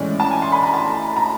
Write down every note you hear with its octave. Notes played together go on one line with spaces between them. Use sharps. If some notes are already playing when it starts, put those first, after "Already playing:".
Already playing: A2 E3 G#3 C#4 D5
A5
G#5
C6
B5
A#5
A5
A#5